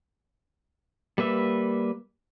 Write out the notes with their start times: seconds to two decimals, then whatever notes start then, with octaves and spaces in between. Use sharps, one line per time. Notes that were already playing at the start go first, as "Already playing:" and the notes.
1.18 G3 A#3 B4 E5